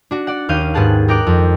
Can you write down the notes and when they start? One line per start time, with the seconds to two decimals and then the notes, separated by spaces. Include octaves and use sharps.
0.11 D4 F#4
0.27 D5 F#5
0.49 D#2 C#4 F5 G6 D#7
0.74 G#2 B3 G4 G#4 A5 F#6
1.08 D#4 A#4 G5 D6 F#6 D7
1.27 F2